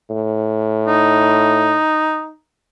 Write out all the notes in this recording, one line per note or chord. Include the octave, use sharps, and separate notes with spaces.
A2
D#4